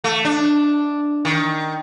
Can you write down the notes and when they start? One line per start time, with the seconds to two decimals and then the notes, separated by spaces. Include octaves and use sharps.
0.04 A3
0.25 D4
1.25 D#3